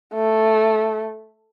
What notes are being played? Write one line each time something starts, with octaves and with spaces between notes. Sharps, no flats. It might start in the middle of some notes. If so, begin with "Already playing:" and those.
A3